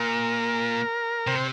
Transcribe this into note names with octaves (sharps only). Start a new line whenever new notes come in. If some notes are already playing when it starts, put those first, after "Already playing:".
Already playing: A#2 A#4
C3 C5